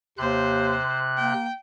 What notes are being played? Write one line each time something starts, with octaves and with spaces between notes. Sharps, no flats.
D#2 C3 C5 F#6
A#3 G5